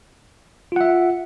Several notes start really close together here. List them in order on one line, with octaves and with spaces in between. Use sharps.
F4 F#5 E5